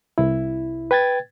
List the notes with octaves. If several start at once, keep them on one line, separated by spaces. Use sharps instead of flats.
C2 E4
B4 G5 G#6 A6